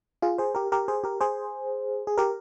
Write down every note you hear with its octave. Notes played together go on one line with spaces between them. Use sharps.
F4 G#4
G#4 C5
G4 A#4
G4 A#4
G#4 C5
G4 A#4
G#4 C5
G#4
G4 A#4